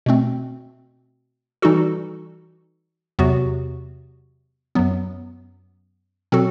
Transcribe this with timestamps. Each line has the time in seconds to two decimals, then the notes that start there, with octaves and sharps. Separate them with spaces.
0.06 B2 A3 C4
1.62 E3 G3 D#4 F#4 A4
3.19 E2 C3 F#3 B3 F#4
4.75 F#2 F#3 B3
6.32 B2 F#3 C4 F#4 A4